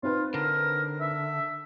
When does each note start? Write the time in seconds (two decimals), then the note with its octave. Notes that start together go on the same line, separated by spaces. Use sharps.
0.03 C4 D#4 F4 B4
0.34 D3 A#4
1.01 E5